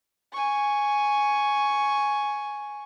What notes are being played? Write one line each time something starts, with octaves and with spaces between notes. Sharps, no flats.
G#5 C#6